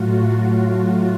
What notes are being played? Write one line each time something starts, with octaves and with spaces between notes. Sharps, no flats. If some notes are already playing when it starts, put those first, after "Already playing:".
Already playing: A2 F#3 A3 F4 F#4
F#4
F#4